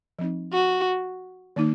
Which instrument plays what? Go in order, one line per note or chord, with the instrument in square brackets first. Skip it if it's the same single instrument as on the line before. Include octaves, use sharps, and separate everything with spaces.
[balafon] F3 C4 D#4
[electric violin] F#4
[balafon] D#3 A#3 D#4